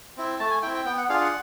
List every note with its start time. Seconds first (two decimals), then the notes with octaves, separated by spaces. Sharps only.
0.17 C4 E4
0.40 A3 A5
0.51 G#5
0.62 C4 E4 G5
0.74 G5
0.85 B3 G5
0.98 F#5
1.09 D4 F4 G#4 F5
1.21 F#5